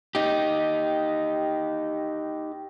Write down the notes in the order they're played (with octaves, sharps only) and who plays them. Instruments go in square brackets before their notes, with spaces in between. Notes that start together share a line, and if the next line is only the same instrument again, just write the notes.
[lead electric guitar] D#4 G4